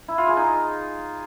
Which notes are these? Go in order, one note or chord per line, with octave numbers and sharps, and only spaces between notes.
E4
F4
G#4
D#4